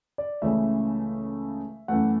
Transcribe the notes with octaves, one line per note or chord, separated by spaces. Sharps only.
D5
C#2 C#3 E3 A3 E5
F#2 E3 A3 F#5